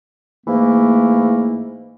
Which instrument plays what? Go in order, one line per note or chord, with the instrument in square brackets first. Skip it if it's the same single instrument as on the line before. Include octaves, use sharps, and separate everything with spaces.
[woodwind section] G#2 E3 A3 A#3